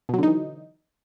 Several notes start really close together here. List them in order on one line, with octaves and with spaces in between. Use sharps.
B2 F#3 D3 D#4 E3